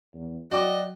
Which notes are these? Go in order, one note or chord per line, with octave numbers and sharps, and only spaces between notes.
E2
F#3 F#4 D5 D#5 G5 D6